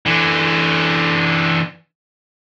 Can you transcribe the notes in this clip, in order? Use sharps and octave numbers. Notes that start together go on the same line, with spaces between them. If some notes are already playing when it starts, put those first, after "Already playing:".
D3 E3